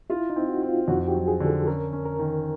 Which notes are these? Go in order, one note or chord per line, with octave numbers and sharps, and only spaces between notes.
E4 F4
D#4
C4
F#4
C4
F4
F2 F#4
G4
F#3
G#4
D3
A4
C#4 A#4
C#4
A#4
D#3